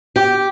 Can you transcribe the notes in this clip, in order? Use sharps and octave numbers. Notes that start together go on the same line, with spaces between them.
G4